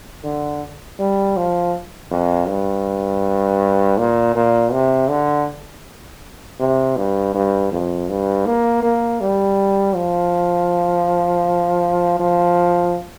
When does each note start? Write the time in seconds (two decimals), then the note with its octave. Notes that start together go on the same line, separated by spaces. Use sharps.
0.24 D3
0.99 G3
1.37 F3
2.11 F2
2.48 G2
3.98 A#2
4.35 A#2
4.72 C3
5.10 D3
6.59 C3
6.97 G2
7.34 G2
7.72 F2
8.09 G2
8.46 A#3
8.83 A#3
9.20 G3
9.95 F3
12.19 F3